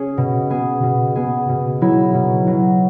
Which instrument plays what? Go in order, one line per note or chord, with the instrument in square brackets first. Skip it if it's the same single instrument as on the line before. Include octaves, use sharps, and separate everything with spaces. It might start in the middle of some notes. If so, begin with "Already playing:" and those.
Already playing: [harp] C#4 G#4
B2
B3 G#4
B2
B3 G#4
B2
F#3 E4
B2
F#3 E4